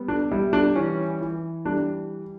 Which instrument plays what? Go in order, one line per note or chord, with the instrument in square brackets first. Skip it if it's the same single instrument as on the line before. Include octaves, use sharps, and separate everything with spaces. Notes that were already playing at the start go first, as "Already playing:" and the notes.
Already playing: [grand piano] G3 B3
D4
G3 E4
D4
E3 C#4
E3
G3 D4